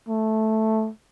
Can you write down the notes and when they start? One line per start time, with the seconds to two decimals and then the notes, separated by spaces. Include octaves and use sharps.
0.09 A3